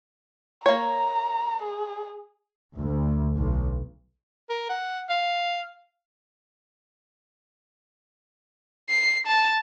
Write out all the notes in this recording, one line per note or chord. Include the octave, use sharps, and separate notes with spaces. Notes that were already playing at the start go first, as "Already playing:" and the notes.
A#3 C#5 A#5
G#4
D2
B1
A#4
F#5
F5
C7
A5